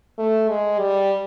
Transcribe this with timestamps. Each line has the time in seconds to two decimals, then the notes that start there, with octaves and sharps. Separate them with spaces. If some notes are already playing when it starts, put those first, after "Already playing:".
0.19 A3
0.49 G#3
0.79 G3